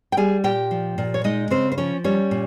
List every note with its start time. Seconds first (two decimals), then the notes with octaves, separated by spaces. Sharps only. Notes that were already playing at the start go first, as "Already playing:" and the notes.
0.12 G5
0.17 G3 G#4 G#5
0.44 A#2 G4 G5
0.71 F3
0.98 A#2
1.14 C#5
1.24 G#3 D#4 D#5
1.51 C#3 C4 C5
1.72 C5
1.78 F3 C#4 C#5
2.04 G3 C#4 C#5
2.31 A#2